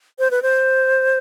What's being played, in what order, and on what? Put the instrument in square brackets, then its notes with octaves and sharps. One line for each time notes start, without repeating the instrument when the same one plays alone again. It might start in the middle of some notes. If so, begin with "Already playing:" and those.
[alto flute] C5
B4
C5